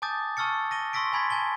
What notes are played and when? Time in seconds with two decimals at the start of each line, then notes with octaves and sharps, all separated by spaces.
0.02 G#5 A5 D6 D#6 G6 A6
0.37 A5 C#6 E6 F6 A6 C#7
0.71 A#6 D#7 G7
0.93 C6 C#6 E6 A#6 B6 D7
1.13 G#5 B5 C6 G#6 A6 B6
1.30 G#5 A5 G7